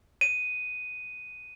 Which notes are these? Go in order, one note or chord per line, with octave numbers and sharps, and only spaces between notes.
D#7